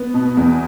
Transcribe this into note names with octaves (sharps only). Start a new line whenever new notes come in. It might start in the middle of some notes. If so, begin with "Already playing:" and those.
Already playing: B3
B2
E2